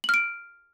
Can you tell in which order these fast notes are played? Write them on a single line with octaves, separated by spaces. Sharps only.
F#7 F6 D7